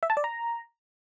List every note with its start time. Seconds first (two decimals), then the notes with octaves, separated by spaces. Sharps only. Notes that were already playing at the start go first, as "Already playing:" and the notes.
0.03 E5
0.10 A5
0.17 D5
0.24 A#5